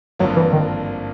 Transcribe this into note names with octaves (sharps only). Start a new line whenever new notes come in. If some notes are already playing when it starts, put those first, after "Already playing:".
G#1 G2 D3 F3 F#3 A#3
E3
D#3